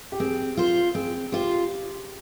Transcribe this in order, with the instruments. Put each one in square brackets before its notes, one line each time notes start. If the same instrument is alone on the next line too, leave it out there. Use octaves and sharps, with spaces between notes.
[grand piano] G4
[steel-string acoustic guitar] C4 [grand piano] G#4
[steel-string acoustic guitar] F4 C5
[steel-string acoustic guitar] C4 [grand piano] G#4
[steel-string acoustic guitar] F4 C5 [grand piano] G4